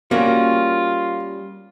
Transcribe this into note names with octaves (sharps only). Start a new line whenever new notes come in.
G3 A#3 C#4 F4 F#4